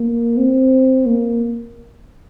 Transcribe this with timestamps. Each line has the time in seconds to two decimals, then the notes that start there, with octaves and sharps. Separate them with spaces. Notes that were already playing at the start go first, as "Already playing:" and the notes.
Already playing: A#3
0.37 C4
1.06 A#3